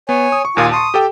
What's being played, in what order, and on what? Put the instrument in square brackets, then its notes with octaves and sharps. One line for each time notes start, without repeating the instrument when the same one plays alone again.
[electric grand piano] B3 [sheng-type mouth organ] C#5 G#5
[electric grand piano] D#6
C#6
[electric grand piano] D#2 A#2 [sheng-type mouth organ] F4 G#5 D#6
[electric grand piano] A5 C6 C#6 [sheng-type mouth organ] D#6
[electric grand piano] G4 A4 G5